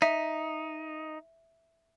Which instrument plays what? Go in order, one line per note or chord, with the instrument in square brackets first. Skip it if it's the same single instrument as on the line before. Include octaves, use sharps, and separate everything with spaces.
[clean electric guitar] D#4 [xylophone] E5